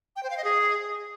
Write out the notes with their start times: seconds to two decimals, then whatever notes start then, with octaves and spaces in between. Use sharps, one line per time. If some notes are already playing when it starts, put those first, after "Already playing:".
0.16 G5
0.23 C5
0.30 F5
0.37 D#5
0.44 G#4